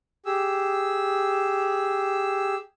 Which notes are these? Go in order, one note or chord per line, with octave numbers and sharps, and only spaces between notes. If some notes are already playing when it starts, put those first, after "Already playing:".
G4 G#4 E6